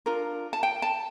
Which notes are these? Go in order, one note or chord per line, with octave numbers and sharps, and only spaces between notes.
D4 F4 A#4
A5
G5
A5